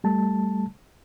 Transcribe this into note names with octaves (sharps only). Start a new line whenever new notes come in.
G3 A3 A5